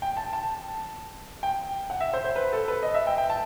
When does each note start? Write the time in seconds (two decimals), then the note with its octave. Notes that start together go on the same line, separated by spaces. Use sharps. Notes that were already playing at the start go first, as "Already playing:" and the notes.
0.02 G5
0.17 A5
0.33 A5
1.43 G5
1.90 F#5
2.01 E5
2.13 C5
2.25 C5
2.36 B4
2.53 A4
2.68 B4
2.83 D#5
2.94 E5
3.07 G5
3.18 G5
3.30 A5